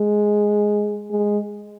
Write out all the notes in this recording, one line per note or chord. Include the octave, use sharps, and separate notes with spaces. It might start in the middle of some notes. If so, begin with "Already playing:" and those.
Already playing: G#3
G#3